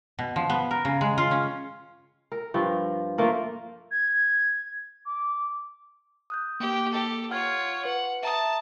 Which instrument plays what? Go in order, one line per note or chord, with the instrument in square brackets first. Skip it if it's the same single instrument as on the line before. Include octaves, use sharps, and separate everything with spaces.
[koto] B2
F3
B3
A#4
C#3
G#3
F4
C#4
[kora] A#4
G2 F3
F3 A3 A#3 A#4
[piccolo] G#6
D6
[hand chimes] D#6 F#6 G6
[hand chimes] A#3 [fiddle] G4
[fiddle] G4 A4
[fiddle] F4 C#5 [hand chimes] F#5 F6 G#6
[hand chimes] B4 [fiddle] F#5
[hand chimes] E5 A#5 D#6 [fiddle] A5